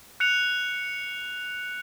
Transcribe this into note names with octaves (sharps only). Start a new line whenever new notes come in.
F#6 C#7 F7